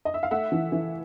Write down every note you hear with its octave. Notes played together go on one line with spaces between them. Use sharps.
D#5
E5
F5
A3 E5 F#5
E3
E3